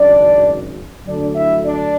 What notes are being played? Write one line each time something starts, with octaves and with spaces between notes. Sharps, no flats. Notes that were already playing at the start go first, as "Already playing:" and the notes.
Already playing: G#1 F#2 C#3 D4 D5
D2 D3 F#3 D4 D5
E4 E5
D4 D5